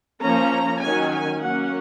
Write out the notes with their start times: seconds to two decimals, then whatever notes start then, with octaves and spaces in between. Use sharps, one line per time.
0.21 F3 A#3 C#4 A#5
0.81 D#3 F#3 C#4 G#5
1.11 G#5
1.41 F#3 A#3 C#4 F#5